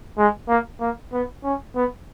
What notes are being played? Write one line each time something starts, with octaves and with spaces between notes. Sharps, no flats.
G#3
A#3
A#3
B3
C#4
B3